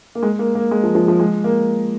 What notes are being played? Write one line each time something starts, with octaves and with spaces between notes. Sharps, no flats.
A#3
G#3
A#3
A#3
G#3
F3
F3
F3
G#3
A#3